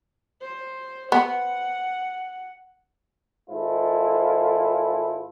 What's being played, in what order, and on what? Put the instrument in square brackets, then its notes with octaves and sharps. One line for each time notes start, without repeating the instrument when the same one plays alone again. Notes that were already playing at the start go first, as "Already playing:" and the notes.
[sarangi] C5
[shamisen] B3 [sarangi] F#5
[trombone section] G#1 G#2 E4 F4 A4